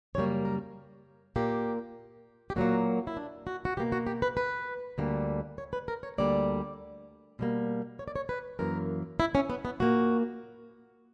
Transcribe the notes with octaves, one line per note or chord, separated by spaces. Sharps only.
F#2 C#3 G3 A#3 C#5
A#4
A#2 A#3 G4
G4
A#2 F#3 A#3 F#4
E4
D4
F#4
F#4
B2 A#3 G4
F#4
G4
B4
B4
D2 D3 G3 A#3
C#5
B4
A#4
C#5
D2 D3 G3 A#3 D5
B2 G3 A#3
C#5
D5
C#5
B4
F#2 E3 A#3 A#4
E4
C#4
B3
B3
A#2 A#3 F#4